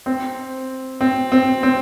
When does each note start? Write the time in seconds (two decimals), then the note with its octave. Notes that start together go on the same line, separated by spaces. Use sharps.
0.06 C4
1.01 C4
1.32 C4
1.63 C4